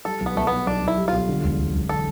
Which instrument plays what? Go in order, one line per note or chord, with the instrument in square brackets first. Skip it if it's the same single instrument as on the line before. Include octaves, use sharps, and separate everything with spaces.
[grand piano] G3 [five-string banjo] A4
[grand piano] B1
[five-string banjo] B3
[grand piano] B1 [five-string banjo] A3
[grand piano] B2 [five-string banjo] B3
[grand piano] B1 [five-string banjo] D4
[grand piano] B1
[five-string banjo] E4
[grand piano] G3
[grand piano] B1 [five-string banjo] F4
[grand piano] D3
E1
E1
E1
[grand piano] D3 [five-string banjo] A4